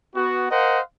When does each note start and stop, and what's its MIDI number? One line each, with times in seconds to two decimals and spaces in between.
0.15 0.48 59
0.15 0.48 66
0.51 0.80 70
0.51 0.80 72
0.51 0.80 75
0.51 0.80 77
0.51 0.80 78